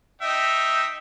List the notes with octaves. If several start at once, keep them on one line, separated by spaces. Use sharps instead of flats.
D#4 E5 G5